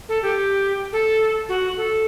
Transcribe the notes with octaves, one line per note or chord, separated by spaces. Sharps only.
A4
G4
A4
F#4
A4